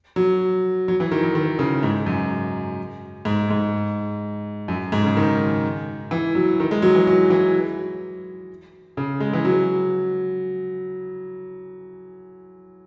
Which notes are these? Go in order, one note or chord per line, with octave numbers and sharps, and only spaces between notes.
F#3
F#3
E3
D#3
E3
D#3
C#3
G#2
F#2
G#2
G#2
F#2
G#2
C#3
D#3
E3
F#3
D#3
G#3
F#3
E3
F#3
E3
C#3
G#3
E3
F#3